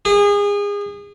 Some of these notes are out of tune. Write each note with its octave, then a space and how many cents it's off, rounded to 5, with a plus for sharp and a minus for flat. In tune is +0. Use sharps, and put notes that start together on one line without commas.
G#4 -30